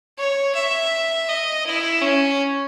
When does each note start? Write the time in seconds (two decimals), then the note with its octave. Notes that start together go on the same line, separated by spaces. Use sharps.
0.18 C#5
0.55 E5
1.28 D#5
1.66 E4
2.02 C#4